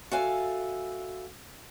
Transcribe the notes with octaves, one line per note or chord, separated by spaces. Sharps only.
F#4 A4 E5 F5 G#5